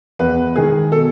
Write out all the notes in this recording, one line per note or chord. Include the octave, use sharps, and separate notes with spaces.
E2 B4
D#3 G#3 G#4
B2 A4